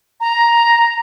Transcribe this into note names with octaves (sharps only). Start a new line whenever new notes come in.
A#5